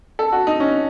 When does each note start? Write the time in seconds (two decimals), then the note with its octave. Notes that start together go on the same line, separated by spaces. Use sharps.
0.19 A4
0.32 F#4
0.47 D#4
0.60 C#4